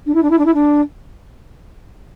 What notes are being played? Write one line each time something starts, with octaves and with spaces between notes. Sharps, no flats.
D4
E4
D4
E4
D4
E4
D4